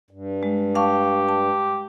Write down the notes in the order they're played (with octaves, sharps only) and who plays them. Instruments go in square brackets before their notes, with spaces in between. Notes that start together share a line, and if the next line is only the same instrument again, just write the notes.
[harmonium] G2
[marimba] G#3
[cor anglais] G4 [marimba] F5 A5 C#6
[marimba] A5